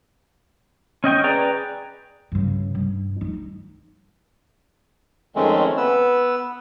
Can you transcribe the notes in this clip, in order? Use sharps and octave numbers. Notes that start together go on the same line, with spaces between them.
C#4 D#5 G5 C#6
G#4 B4 D5 G5 A#5
G2 C#3
G2
D#4
F2 D#3 G#3 A3 C4 C#4
B3 B4 E6